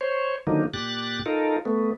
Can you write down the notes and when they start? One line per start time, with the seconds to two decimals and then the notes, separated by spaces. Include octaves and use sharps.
0.01 C5 C#5
0.47 D3 D#3 F3 F#3 A#3 D#4
0.74 A#2 G4 F#6 A6
1.26 D#4 F4 A4 A#4
1.65 A3 B3